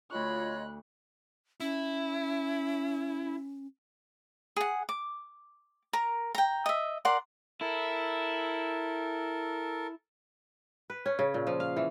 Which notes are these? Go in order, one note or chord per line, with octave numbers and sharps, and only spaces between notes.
D2 F4 C#5 D#5 B5 C#6 F#6
C#4 E4
G#4 F#5
D6
A#4 A#5
G5 A#5
D#5 E5
A#4 D5 F#5 C6
E4 A4 A#4
B4
C#4
C#3
A#2
F3
F5
E3